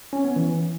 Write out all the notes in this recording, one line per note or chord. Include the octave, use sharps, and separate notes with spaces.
C#4
B3
E3